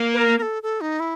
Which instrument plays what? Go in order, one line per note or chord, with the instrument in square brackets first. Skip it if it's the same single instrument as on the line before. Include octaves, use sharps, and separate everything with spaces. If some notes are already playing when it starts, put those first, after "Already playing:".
Already playing: [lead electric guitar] A#3
[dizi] B4
A#4
A#4
A4
A4
D#4
E4